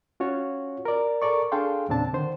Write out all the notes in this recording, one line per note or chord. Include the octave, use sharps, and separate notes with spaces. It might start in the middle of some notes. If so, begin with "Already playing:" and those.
C#4 F4 F#4 C#5
A#4 D5
A4 A#4 D5 C#6
D4 G#4 A4 F5 G5 C6
E2 A#2 C#3 C4 D4 A5
D3 D#3 C5